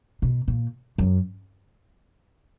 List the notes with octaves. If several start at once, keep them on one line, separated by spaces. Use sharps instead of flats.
B2
A#2
F#2